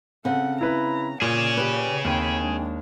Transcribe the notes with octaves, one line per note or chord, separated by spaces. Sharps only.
C#3 C4 A4 F#5
E4 B4 A#5 B5
A#2 G#4 C#5 D5
G4 B4
D#2 C4 G5 B5
G#3 D4